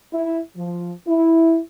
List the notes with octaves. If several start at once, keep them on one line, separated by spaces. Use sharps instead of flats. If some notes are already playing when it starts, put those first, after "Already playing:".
E4
F3
E4